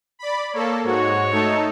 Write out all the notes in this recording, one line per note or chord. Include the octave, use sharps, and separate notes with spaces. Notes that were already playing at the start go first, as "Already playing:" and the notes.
D5 B5
A#3 A4 C#5
G#2 F#4 C#5
A3 D#4 A4